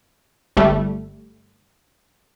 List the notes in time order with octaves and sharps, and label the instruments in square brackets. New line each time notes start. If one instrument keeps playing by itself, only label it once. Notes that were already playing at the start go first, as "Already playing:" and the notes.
[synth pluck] G1 G3 A3